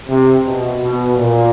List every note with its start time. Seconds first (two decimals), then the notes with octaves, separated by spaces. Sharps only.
0.08 C3
0.43 B2
0.79 B2
1.15 A#2